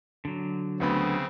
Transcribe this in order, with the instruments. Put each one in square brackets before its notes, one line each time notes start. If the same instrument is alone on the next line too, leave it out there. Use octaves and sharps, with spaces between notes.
[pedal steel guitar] D3 F#3
[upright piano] D2 B3 B5 [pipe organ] C#3 C4